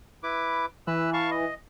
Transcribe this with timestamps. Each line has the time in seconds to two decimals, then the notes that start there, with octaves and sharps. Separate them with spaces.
0.23 E4 B4 D6
0.87 E3 B4 E6 F#6
1.13 F5 A5 C#6
1.31 D#5